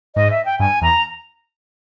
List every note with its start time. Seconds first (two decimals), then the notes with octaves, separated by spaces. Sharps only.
0.15 G#2 D#5
0.31 E5
0.45 G5
0.59 G2 G#5
0.82 E2 A#5